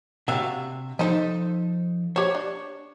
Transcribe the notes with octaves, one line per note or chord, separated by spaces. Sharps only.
C3 D4 F#4 E5 F5
F3 D#4 A4 C5 D#5
G4 C5 C#5
D4